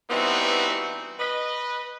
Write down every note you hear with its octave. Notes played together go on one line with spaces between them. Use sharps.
E3 G3 B3 C4 D#4 F#4
B4 D#5